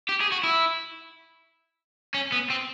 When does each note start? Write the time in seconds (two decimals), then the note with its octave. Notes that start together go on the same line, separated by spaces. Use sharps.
0.09 G4
0.21 G#4
0.32 F#4
0.43 E4
2.15 C#4
2.32 B3
2.50 C4